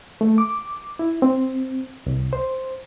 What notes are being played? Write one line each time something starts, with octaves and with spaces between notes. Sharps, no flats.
A3
D6
E4
C4
C2
C5